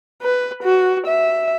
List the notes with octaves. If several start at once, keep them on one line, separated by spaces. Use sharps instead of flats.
B4
F#4
E5